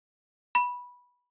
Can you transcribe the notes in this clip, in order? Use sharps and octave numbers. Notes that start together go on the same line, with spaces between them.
B5